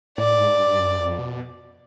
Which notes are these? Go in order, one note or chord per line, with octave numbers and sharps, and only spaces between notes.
A2 D5
G#2
G2
F#2
F2
B2